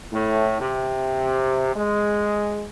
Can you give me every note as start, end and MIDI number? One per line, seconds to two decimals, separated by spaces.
0.12 0.59 45
0.59 1.70 48
1.75 2.66 56